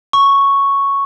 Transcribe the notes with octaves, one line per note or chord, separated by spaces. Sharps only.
C#6